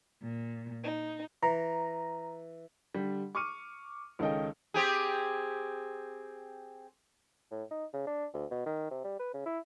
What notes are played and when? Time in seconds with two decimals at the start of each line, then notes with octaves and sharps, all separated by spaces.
0.23 A#2
0.84 D#4
1.43 E3 A#5
2.94 D3 G3
3.35 C#6 D6 F6 C#7 D#7
4.19 C#2 D#3 C#4 A4 D#5 G5
4.74 C4 G4 G#4
7.51 A2
7.71 D#4
7.93 C#3
8.07 D4
8.34 D2
8.51 B2
8.66 D#3
8.91 C3
9.04 G3
9.19 B4
9.34 C#3
9.46 E4